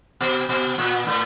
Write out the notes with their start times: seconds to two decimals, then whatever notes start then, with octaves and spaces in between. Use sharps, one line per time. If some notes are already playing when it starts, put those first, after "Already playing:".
0.21 B2
0.49 B2
0.78 A#2
1.07 A2